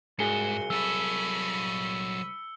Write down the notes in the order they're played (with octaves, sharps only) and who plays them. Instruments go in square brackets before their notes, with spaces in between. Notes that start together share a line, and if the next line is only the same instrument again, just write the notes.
[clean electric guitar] C2 G#4 [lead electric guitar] G#2 [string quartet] F#4 [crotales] C#7 G7
[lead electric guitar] F#3 A4 [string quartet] B5 C#6 D#6 [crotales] E6